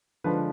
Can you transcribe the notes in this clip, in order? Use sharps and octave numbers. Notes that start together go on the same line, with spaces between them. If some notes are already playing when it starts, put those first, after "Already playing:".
D3 F3 G#3 D4 B4